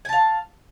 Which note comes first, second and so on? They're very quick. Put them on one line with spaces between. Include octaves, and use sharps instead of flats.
G#5 A5 F5